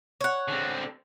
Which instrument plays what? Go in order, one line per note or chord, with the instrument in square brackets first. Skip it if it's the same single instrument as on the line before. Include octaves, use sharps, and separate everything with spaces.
[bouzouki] C#5 F#5
[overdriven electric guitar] D3 C4